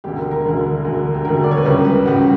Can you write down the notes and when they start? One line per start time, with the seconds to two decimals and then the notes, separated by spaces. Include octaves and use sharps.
0.04 E1 D2 D3 G4
0.17 A#4
0.31 A#4
0.44 E1 D2 D3
0.85 E1 D2 D3
1.14 G4
1.25 E1 D2 D3 A#4
1.44 D5
1.51 C#5
1.57 B4
1.65 C#2 C#3 G3 A#4
1.85 B4
2.05 C#2 C#3 G3 F#4